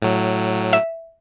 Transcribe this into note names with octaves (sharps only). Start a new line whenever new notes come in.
A2 F#3
E5